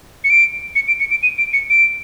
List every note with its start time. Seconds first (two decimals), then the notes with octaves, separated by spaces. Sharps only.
0.24 C#7
0.30 D7
0.75 C#7
0.88 D7
1.00 C#7
1.10 D7
1.23 D#7
1.38 D7
1.53 C#7
1.70 D7